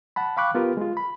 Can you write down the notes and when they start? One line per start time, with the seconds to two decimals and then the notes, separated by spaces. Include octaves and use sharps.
0.16 F#5 A5 B5
0.37 F5 G5 B5 C#6 D6 F#6
0.55 B3 F4 G4 A#4 B4
0.77 G#3 F4
0.97 B5